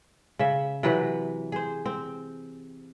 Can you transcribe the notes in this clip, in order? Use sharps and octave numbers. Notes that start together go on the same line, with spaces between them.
C#3 E5
C3 E3 F#3 B4
G#4 C5
C4